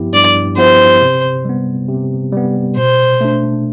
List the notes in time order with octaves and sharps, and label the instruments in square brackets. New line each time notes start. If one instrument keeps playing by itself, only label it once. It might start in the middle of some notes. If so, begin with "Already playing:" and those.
Already playing: [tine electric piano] G2 F3 B3 E4 G4
[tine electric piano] G2 [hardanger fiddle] D5
[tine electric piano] F3 B3 E4 G4 [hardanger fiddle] C5
[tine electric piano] C3
G3 B3
C3
G3 B3
[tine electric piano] B2 [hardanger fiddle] C5
[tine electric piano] A3 D4